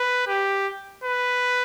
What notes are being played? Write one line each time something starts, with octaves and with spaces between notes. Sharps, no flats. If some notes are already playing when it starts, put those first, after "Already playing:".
Already playing: B4
G4
B4